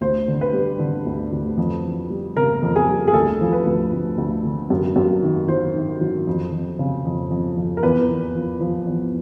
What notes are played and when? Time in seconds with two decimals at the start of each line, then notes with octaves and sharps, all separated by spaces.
0.01 D2 C5
0.28 D3
0.41 B4
0.53 G3
0.79 D3
1.06 D2
1.32 D2
1.57 F2
1.84 E3
2.10 G3
2.36 C#3 A#4
2.62 F2
2.76 G#4
2.88 G3
3.08 G#4
3.14 D2 A4
3.41 F3
3.53 B4
3.66 D2
3.93 D2
4.18 D2
4.44 D3
4.70 F#2
4.96 F#2
5.22 D#3
5.48 F#3 C5
5.75 D#3
6.01 F#3
6.27 F2
6.52 F2
6.79 C#3
7.05 F2
7.30 F2
7.57 F2
7.77 A#4
7.83 E2 B4
8.09 E2
8.35 F3
8.61 F3
8.87 E2